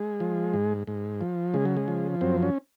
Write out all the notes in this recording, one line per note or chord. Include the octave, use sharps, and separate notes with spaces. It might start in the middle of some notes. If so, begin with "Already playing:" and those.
Already playing: G#3
F3
G#2
G#2
F3
C#3 G#3
F#3
G#3
F3
F#2 C4
C#4